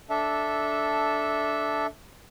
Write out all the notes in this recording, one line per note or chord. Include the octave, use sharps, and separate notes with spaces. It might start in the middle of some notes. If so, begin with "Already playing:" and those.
D4 A4 E5